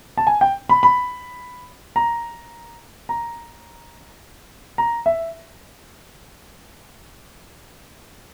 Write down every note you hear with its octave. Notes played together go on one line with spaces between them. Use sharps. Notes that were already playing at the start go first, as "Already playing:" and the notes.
A5
G#5
G5
B5
B5
A#5
A#5
A#5
E5